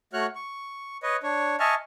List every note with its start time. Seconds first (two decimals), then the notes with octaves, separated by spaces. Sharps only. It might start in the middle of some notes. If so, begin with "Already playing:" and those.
0.13 A3 F#4 C#5 F6 F#6
0.35 C#6
1.03 B4 C#5 D#5
1.23 D4 C#5
1.60 D#5 E5 G#5 A5 C#6 F6